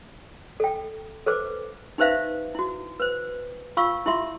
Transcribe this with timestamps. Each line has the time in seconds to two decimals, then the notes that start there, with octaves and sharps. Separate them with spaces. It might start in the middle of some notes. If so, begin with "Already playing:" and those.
0.60 A4 G5
1.26 A4 B4 C5 D6
1.98 D#4 G4 B4 C5 E5 F5
2.55 E4 F#4
3.00 B4 C5
3.77 F4 F5 C#6 E6
4.06 E4 F4 G4 E5 C6